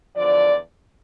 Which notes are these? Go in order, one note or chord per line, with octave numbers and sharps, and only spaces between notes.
E2 D3 F3 D5